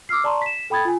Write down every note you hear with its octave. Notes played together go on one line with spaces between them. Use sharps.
D6 E6 F6 C7
D5 A5 A#5 C6 C#6
B6 E7
A4 G5 B5 D#6 G#6 A6
F4 G#5